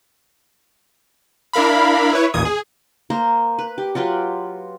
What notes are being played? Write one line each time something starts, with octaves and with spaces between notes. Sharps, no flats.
D4 E4 A#4 F5 B5
E4 B4 C#5
A1 D#2 A#2 D#6 G#6
G#4
A#3 C5 A#5
B4
G4
F#3 F4 G4 B4